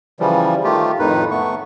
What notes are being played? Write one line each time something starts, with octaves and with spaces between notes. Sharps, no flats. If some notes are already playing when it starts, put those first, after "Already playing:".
C#3 E3 F3 G3
D#3 A3 F4 G4
F2 A2 D#3 D#4 B4
A3 B3 C#6